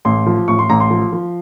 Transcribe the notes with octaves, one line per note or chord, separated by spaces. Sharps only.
A1 C6
F3
A1 C#6
C6
A1 A#5
C6
F3
F3